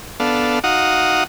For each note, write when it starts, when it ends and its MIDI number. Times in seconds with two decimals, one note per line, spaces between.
0.20 0.59 59
0.20 0.59 62
0.20 0.59 69
0.20 0.59 77
0.64 1.24 63
0.64 1.24 66
0.64 1.24 77
0.64 1.24 78
0.64 1.24 87